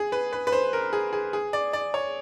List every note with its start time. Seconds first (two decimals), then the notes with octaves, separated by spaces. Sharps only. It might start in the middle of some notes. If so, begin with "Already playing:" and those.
Already playing: G#4
0.12 B4
0.33 B4
0.47 B4
0.52 C5
0.73 A#4
0.93 G#4
1.13 G#4
1.33 G#4
1.53 D5
1.73 D5
1.94 C#5